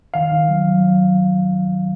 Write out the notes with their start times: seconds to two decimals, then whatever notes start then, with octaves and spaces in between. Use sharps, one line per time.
0.14 D#3 F5
0.31 D#3
0.49 F#3
0.67 F#3
0.84 F#3